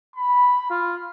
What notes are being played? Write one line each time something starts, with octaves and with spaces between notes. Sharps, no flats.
B5
F4